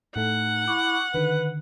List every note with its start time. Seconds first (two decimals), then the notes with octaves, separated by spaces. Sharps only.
0.16 A2 A3 D#4 F#5
0.68 E4 C#6 D6
1.14 D3 D#3 B4